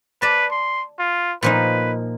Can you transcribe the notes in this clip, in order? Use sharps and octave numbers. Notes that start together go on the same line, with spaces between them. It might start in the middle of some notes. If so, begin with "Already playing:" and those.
B4 D5 A5
C6
F4
A#2 F3 D#4 B4